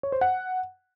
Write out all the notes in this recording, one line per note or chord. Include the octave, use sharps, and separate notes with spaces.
C#5
C5
F#5